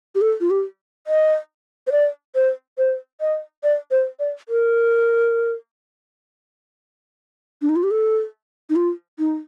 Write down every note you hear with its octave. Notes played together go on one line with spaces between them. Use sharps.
G4
A4
F4
G4
D#5
C5
D5
C5
C5
D#5
D5
C5
D5
A#4
D4
D#4
F4
G4
A4
D#4
F4
D#4